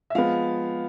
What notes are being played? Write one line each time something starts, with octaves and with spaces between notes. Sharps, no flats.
E5
F3 G#3 B3 F5